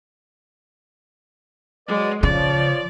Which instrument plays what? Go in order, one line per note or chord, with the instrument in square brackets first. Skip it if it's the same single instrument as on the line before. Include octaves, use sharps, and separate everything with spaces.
[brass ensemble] F#3 B4 D5 [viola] G#3
[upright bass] C#3 [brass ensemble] F3 C#5 [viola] D5